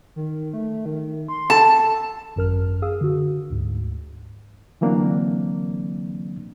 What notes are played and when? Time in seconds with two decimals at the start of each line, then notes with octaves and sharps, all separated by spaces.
0.16 D#3
0.53 A3
0.86 D#3
1.28 C6
1.50 A4 A5
2.36 G#1 F#2 A#4 F6
2.82 G#4 F5 D#6 E6
3.01 D3 F#4
3.50 D2 G#2
4.81 D3 E3 F#3 A#3 C4 D4